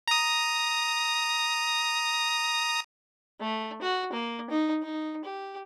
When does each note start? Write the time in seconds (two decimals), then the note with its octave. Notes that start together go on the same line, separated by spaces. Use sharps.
0.08 A#5 D#6
3.40 A3
3.82 F#4
4.12 A#3
4.50 D#4
4.82 D#4
5.25 G4